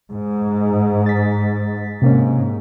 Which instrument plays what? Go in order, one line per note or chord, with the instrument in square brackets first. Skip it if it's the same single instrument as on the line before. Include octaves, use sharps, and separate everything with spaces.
[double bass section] G#2
[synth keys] A6 B6
[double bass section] G#2 [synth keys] C3 A#3 C#4